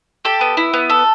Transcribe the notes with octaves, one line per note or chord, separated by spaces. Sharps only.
G4 A4
B3
E4
B3
A4